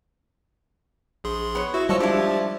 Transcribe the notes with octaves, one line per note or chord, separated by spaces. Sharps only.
A#1 G#4 C6
B3 C#5
E4 F#4
F3 G3 G#3 F#4 C#5 D#5 A5 E6
D4 E4 G4